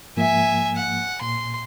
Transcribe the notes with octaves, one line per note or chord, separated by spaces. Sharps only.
G#2 F3 A#3 E5 G#5
F#5
A#2 C6